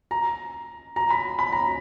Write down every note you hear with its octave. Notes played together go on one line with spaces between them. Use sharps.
A#5
A#5
B5
B5
A#5